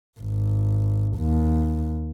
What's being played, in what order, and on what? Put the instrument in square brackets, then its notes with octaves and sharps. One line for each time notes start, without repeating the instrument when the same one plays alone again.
[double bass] G#1
D#2